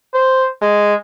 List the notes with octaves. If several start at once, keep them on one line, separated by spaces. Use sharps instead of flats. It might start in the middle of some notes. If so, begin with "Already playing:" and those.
C5
G#3